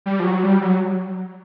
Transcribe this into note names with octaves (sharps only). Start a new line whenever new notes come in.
G3
F3
F#3
G3
F#3